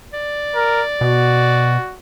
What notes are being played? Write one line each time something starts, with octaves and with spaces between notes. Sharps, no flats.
D5
A#4
B2 F#4